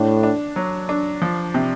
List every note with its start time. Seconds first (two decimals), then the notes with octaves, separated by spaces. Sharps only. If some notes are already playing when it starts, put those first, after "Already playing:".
Already playing: A2 D4
0.23 D4
0.56 F#3
0.89 D4
1.22 F3
1.54 C3